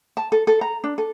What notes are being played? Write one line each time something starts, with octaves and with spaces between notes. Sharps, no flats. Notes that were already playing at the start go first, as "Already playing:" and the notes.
A5
A4
A4
A#5
D4
A4